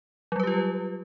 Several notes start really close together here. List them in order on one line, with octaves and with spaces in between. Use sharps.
F#3 G3 B4 G4 F4